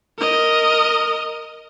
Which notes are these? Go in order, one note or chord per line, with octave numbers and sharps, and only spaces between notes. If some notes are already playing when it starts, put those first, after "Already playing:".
A#4 D#5